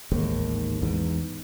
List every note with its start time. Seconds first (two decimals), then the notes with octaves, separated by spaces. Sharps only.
0.12 A1 D#2 G#2 D#3
0.82 E2 G#2